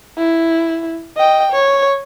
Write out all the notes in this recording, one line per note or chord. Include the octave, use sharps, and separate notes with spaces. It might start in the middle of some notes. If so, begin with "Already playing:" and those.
E4
D#5 G5
C#5